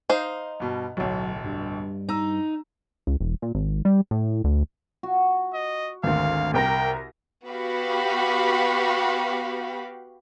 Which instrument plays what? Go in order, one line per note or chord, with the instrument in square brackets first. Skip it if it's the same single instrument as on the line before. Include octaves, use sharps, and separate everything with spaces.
[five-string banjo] D#4 C5 [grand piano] F5
[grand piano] G2 B2
[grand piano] D1 B1 [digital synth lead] F#3
[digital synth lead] G2
[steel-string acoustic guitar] D#4 [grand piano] A#5 E6
[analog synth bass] C#2
E1
A#2
G#1
G3
A2
D2
[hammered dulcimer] F#4
[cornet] D#5
[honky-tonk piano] G#1 D2 [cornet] F5
[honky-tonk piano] C2 A#4 A#6 [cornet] G5
[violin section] B3 F#4 G4 F5 B5